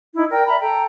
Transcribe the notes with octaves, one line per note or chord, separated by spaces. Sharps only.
D#4 E4
A#4 D5 G5
D5 E5 A#5 B5
A4 G5 A#5